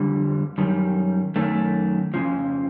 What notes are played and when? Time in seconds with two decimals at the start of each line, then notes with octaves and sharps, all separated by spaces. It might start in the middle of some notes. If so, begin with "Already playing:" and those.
Already playing: F2 D3 G3
0.58 F#2 D#3 G3
1.36 F#2 D#3 F#3 A3
2.14 F2 C#3 F3